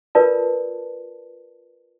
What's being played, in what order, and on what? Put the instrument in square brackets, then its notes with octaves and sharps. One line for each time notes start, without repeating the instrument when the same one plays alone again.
[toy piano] F4 A#4 B4 D5 A5